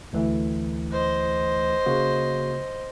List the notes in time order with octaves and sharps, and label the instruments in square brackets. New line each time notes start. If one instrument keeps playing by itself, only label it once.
[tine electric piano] D2 E3 A3
[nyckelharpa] C5 D#5
[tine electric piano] C#3 A#3 F#4